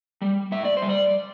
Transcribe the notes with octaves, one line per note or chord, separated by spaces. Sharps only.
G3
A2 E5
D5
C5
G3
D5